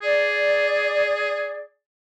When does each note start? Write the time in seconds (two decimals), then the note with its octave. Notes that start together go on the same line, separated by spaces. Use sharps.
0.02 G#4 D5